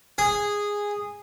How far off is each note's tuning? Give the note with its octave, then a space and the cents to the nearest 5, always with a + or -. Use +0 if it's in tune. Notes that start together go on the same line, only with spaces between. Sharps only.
G#4 -10